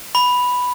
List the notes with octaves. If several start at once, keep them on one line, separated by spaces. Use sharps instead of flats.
B5